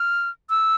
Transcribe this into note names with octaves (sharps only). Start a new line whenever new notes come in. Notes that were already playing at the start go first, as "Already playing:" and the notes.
Already playing: F6
E6